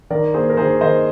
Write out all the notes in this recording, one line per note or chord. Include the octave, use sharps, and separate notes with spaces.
D#3 A#4 D5
A#3 G#4 C5
A#4
D#3 G#4 C5
D#3 C5 D#5